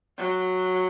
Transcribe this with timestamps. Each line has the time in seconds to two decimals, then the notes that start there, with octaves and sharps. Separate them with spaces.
0.18 F#3